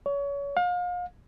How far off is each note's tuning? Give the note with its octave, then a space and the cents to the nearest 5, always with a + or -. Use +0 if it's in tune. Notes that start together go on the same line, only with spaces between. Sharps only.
C#5 +30
F5 +35